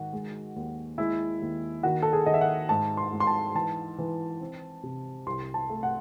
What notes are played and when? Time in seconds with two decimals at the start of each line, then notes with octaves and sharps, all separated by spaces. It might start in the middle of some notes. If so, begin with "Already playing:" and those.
Already playing: G#2 D#3 F#4
0.13 G#3
0.56 D#2
0.98 G#3 E4
1.42 D#2
1.83 D#3 F#4
2.02 A4
2.13 G#4
2.26 D#3 D#5
2.34 E5
2.41 F#5
2.69 G#2 A5
2.97 C6
3.13 G#2
3.20 C6
3.27 A5
3.55 E3 A5
3.98 E3
4.40 C4
4.83 C3
5.26 C2 C6
5.54 A5
5.69 A3
5.83 F#5